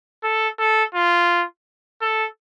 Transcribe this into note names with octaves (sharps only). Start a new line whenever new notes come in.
A4
A4
F4
A4